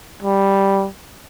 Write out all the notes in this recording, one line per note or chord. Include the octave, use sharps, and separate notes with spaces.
G3